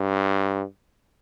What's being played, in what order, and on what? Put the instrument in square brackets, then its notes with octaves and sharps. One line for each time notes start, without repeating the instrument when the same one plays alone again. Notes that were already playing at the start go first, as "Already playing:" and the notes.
Already playing: [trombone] G2